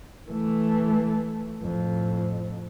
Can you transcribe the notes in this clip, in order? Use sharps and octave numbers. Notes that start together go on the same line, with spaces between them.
E3 A3
F2 A2